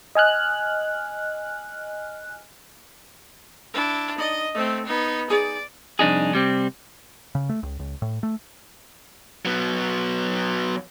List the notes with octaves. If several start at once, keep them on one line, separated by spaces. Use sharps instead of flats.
D#5 G#5 F6 F#6
D4 E4
D#4 D5 D#5
A3 C4 C5 D#5
B3 D#4
D#4 G#4 D5
C2 F2 D4 D#4 G#4
C3 G3 C4
C#3
A3
C#2
C#2
A2
A3
F#3 B3